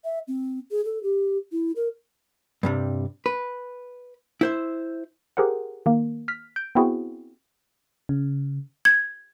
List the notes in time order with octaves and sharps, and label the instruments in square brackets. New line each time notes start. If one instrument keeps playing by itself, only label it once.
[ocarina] E5
C4
G#4
A4
G4
E4
A#4
[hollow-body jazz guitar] G2 C3 G3
B4
E4 C5 E5
[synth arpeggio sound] G4 G#4 A#4 C5 F#5
D#3 A#3
F6 B6
G6 D7
B3 C4 E4 F#4 G#4
[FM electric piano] C#3
[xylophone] G#6